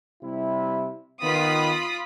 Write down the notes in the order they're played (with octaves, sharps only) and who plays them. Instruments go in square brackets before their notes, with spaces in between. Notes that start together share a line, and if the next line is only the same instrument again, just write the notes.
[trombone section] C3 G3 E4
[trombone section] D#3 B3 [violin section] F4 B5 D#6